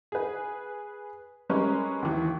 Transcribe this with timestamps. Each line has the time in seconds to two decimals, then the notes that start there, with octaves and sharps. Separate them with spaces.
0.12 G#4 B4
1.49 G3 G#3 C#4 A#4 B4 C#6
2.02 D#2 E3